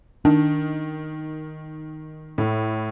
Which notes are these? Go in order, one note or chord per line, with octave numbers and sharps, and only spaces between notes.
D#3 D4
A2